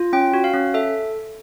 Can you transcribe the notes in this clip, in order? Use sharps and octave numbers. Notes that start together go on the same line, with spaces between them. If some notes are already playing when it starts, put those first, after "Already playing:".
Already playing: F4
C#4 G5
F#4
F5
C#4
A4 E5